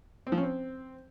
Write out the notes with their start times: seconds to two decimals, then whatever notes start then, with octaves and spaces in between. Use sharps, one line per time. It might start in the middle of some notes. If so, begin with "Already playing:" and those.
0.27 C4
0.32 F3
0.38 C#4
0.43 C4